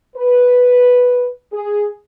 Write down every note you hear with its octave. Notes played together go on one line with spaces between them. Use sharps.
B4
G#4